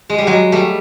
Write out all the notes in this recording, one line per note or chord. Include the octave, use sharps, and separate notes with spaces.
G#3
G3
F#3 G#3
G3 A3